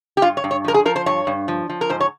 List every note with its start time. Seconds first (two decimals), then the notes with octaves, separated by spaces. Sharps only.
0.17 G4
0.22 G2 F4
0.37 C#5
0.44 G2
0.51 C#5
0.64 F3 A#4
0.74 G#4
0.85 F3 A#4
0.96 C5
1.06 G2 C#5
1.27 G2
1.48 F3
1.69 F3
1.81 A#4
1.89 G#2 C5
2.00 C#5